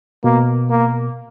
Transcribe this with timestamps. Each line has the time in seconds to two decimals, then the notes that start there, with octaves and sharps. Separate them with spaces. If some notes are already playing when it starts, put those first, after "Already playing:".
0.24 B2 A#3
0.70 A#3